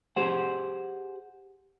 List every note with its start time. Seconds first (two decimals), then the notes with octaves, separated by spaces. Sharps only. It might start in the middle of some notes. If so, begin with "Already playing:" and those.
0.16 G4 G#4 C5 F#5